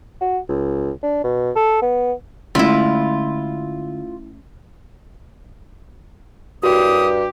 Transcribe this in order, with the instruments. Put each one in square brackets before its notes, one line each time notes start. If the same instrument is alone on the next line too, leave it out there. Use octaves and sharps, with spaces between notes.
[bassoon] F#4
C#2
D4
B2
A4
B3
[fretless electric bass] D3 G#3 [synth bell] A3 C#4 [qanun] E4 B5 [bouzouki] F4
[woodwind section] C2 C#3 D#6 [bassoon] G2 [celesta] F#4 [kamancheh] G4